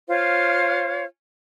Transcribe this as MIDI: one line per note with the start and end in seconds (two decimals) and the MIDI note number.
0.08 1.05 65
0.08 1.05 72
0.08 1.05 73
0.08 1.05 77